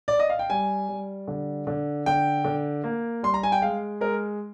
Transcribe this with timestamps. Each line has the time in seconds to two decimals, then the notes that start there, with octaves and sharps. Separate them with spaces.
0.08 D5
0.19 D#5
0.29 F5
0.39 G5
0.50 G3 G#5
0.89 G3
1.28 D3
1.67 D3
2.06 D3 G5
2.45 D3
2.84 A#3
3.23 G3 C6
3.34 A#5
3.43 G#5
3.52 G5
3.62 G#3 F5
4.01 G#3 A#4